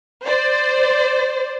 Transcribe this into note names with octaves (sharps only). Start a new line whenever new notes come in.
C5 D5